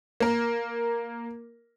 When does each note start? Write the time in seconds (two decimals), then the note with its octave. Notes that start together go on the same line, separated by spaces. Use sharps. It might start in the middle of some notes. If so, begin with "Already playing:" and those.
0.20 A#3 A#4